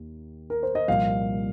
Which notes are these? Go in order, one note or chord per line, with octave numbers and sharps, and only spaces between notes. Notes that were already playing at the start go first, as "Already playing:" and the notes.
Already playing: D#2 D#3 A#3
A#4
C5
D#5
C2 A#2 F3 A#3 F5